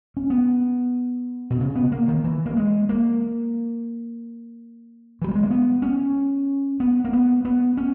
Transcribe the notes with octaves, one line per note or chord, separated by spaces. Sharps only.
C#4
B3
B2
C#3
B3
A#3
D#3
E3
A#3
G#3
A#3
E3
G3
G#3
A#3
B3
C#4
B3
A#3
B3
B3
C#4